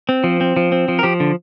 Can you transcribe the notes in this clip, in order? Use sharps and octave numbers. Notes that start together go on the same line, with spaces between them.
C4
F3
C4
F3
C4
F3
A#4
F3 G4
D3